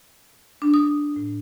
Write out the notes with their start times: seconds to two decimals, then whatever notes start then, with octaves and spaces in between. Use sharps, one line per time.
0.62 D4
0.74 D#6
1.16 A2